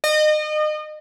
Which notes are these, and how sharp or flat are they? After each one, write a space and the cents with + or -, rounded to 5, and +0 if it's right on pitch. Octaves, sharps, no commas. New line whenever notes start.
D#5 -30